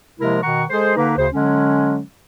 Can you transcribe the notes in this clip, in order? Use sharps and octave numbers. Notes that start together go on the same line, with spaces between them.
C3 F3 G#3 A#3 E4 A#4
B2 D#3 F#5 A#5 C#6
G#3 G#4 A4 C5
D3 A#3 D#4 B4
D2 C#3 C5
D3 F#3 G#3 C#4